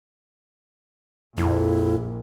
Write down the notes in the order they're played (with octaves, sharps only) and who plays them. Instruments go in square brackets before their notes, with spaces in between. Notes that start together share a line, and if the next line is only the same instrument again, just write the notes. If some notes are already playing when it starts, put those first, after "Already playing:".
[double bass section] A#1 [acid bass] F2 [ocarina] E4